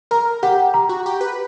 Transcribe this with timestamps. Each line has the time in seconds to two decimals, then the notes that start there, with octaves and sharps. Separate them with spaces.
0.11 A#4 A#5
0.43 G4 F#5
0.74 A#5
0.89 F#4
1.06 G4
1.21 B4